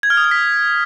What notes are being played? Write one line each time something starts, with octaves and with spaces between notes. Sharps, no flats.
G#6
F6
D#6
F6
B6